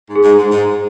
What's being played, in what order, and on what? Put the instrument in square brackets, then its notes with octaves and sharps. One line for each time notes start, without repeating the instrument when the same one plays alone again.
[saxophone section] G#2
[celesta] G#4
[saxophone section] G#2
G#2
G#2